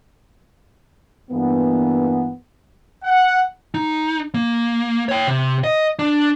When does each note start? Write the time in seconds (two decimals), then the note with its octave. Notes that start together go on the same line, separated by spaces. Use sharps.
1.31 G2 E3 A#3 B3
3.03 F#5
3.74 D#4
4.34 A#3
5.09 C#5 G5
5.27 C3
5.64 D#5
5.99 D4